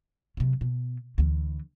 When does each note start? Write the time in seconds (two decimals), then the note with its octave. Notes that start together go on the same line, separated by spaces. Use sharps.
0.37 C3 F#3
0.61 B2
1.18 D2 E3